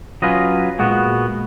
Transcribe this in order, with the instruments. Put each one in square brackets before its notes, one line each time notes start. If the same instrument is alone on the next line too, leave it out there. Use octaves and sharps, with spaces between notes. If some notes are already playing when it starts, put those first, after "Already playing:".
[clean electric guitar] F#3 C#4 F4 B4 D#5
A#2 G#3 B3 F#4